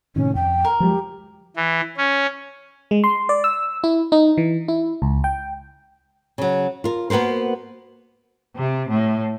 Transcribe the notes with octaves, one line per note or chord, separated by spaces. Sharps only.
A2 C3 D#3 C#4
F2 G5
A#4
F3 F#3 G#3 G4
E3
C#4
G#3
C6
D5
E6
E4
D#4
E3
E4
C#2
G5
C#3 F#3
F4 A#4
A#3 B3 F#4 A#4 C5
C3
A2